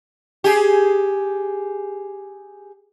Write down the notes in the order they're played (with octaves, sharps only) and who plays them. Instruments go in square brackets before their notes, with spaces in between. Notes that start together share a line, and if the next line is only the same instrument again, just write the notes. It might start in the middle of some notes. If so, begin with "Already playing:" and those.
[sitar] G4 G#4